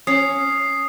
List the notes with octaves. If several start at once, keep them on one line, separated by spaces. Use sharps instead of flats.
C#4 D#6 C7